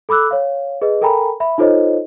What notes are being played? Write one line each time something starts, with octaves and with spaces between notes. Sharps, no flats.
A4 B5 D6 E6 F#6
C#5 F5
G#4 B4 D#5
A4 A#4 G5 G#5 A#5 B5
E5 B5
D#4 F4 A4 C5 C#5 D#5